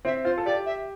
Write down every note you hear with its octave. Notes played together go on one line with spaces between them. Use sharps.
C4 E5
F4 C5
A4
G4 D5
E5